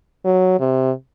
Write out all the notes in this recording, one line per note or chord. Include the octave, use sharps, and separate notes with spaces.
F#3
C3